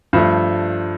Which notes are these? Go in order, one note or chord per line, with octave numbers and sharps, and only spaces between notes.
G2 F3 A3